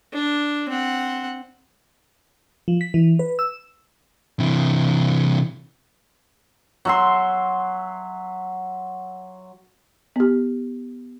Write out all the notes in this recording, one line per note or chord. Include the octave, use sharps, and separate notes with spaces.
D4
C4 F#5
F3
B6
E3
B4
E6
C3 E3
F#3 E5 C6
B3 G4